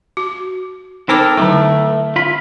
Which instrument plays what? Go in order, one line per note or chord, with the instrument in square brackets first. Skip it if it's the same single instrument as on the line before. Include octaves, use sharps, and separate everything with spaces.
[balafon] F#4
[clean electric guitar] C4 A4 A#4 [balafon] D#4 C5 D6
[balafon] D3 F#3 E4 [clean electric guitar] A3
[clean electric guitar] F4 B5